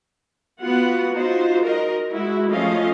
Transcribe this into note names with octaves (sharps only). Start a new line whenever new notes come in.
B3 F4 F#4 F#5
D#4 F4 F#4 C5
F#4 A#4 D#5
G#3 E4 F#4
F3 A3 C#4 D#5 F5